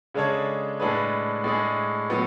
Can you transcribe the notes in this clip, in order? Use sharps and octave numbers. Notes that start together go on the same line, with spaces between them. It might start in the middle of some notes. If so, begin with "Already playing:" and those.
C#3 G#3 D4 A4 C#5
A2 G#3 D4 G#4 B4
A2 G#3 D4 G#4
A2 F#3 B3